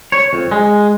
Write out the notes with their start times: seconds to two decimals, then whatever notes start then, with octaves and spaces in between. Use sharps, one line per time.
0.12 C#5
0.33 F2
0.51 G#3